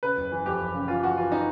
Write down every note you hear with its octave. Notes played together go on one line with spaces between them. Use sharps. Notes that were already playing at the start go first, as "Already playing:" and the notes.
C#3 B4
F#1
E3
F2 G4
F#1
C#3
E3 F4
E3 F#4
E3 F4
D#4